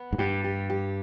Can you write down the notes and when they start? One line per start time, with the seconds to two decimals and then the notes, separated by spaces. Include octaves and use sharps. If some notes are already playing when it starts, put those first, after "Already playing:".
Already playing: B3
0.13 G#2
0.18 G2 G4
0.44 G4
0.70 G4